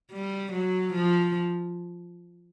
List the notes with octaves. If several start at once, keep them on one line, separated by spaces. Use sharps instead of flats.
G3
F#3
F3